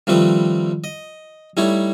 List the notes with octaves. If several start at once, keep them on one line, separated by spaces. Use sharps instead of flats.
D#3 F3 G3 A3 C4 B4
D#5
G3 A3 D#4 E4 C#5